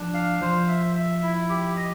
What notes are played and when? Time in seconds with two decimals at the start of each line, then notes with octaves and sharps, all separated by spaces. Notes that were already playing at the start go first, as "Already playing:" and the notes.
Already playing: F3 D4
0.14 F5
0.41 F3 C5
0.68 E5
0.96 E5
1.22 E4
1.49 G4
1.76 D#5